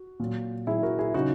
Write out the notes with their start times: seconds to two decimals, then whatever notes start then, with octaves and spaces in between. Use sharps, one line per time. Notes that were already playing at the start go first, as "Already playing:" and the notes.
Already playing: F#4
0.19 A#2 F#3
0.67 A#2 F#3 E4 G#4
0.83 F#4 A#4
0.99 E4 G#4
1.14 C#3 F#3 D#4 F#4